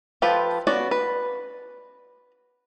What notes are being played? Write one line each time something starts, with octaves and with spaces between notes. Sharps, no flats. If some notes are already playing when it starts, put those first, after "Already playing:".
F3 F4 G4 A4 B4
B3 C#4 F#4 D5
B4